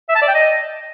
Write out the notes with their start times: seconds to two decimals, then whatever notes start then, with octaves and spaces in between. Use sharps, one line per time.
0.09 E5
0.15 A5
0.22 D5
0.28 G5
0.34 D#5